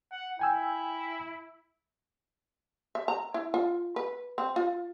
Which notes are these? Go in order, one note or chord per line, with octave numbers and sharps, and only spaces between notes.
F#5
E4 G5 G#5 E6
E5
A#5
E4
F4
B4
C4
F4